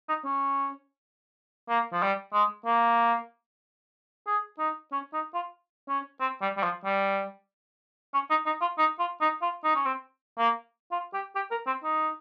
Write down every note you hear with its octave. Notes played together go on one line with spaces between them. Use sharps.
D#4
C#4
A#3
F3
G3
G#3
A#3
G#4
D#4
C#4
D#4
F4
C#4
C4
G3
G3
F3
G3
C#4
D#4
D#4
F4
D#4
F4
D#4
F4
D#4
C#4
C4
A#3
F4
G4
G4
A#4
C4
D#4